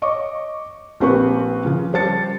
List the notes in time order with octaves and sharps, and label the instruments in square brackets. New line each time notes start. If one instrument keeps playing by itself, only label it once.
[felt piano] C#5 D#5 C#6 D6
A#1 C4 G4 B4 C#6
C#3 F3
G3 G4 C5 A5 A6 C#7